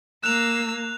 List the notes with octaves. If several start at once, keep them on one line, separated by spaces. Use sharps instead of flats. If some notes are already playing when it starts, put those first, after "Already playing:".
A#3 E6 F#6 F7